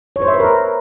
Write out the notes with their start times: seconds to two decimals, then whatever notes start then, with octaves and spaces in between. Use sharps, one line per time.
0.16 C#5
0.22 C5
0.28 E5
0.34 B4
0.40 A#4